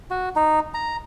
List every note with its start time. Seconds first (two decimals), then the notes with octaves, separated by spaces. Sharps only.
0.10 F#4
0.36 D#4
0.74 A#5